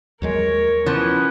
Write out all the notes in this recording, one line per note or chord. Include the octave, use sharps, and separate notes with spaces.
D#2 F#3 G#3 A#4 C#5
E3 F3 B3 C#4